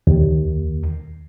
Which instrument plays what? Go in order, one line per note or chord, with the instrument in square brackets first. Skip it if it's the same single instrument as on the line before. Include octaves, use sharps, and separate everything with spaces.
[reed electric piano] D#2